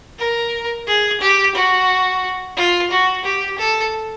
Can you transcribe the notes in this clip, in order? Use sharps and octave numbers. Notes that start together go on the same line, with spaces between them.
A#4
G#4
G4
F#4
F4
F#4
G4
A4